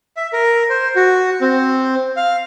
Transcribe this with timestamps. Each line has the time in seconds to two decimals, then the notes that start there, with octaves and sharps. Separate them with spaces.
0.17 E5
0.33 A#4
0.69 C5
0.96 F#4
1.41 C4
2.17 F5